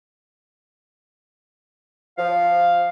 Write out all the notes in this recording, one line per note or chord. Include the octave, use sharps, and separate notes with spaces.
F3 F5